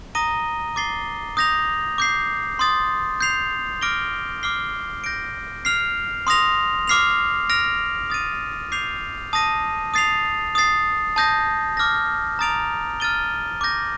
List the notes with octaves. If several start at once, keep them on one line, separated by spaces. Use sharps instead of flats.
A#5 D#6 A#6 D#7 G7
D6 A6 C7 G7
D#6 G6 A#6 F7
D6 G6 C7
C6 D#6 A6
G6 C7 F7
D6 F6 A#6 D7 G7
D6 F6 C7 G7
G6 A#6 D7
F6 C7 F7
C6 D#6 A#6 F7
D6 F6 C7 F7
F6 A#6 D7 F7
D#6 A6 D#7
D6 G6 C7 F7
A5 D#6 A#6 D#7
D#6 A6 C7 F7
D#6 A6 C7
A5 D#6 G6 A#6
D6 F6 A#6
A#5 D#6 A6 D7 F7
F6 A6 D#7 G7
D6 G6 A#6